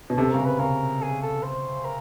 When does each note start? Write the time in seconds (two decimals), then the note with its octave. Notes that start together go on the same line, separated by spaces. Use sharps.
0.10 B2
0.17 C3 A4
0.32 C#3 A#4
0.39 C3
0.46 B4
0.59 C#3 A#4
1.02 G#4
1.22 A4
1.43 C5
1.85 A#4